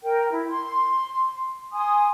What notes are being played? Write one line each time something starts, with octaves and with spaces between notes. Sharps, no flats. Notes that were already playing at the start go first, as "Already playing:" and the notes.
A#4 G5
E4
C6
G#5 C6 D#6